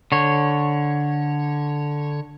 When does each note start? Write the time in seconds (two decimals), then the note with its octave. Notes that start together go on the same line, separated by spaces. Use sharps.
0.12 D3 C#5